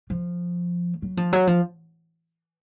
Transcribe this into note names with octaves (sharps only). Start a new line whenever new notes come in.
F3
F#3
F3
F#3
F3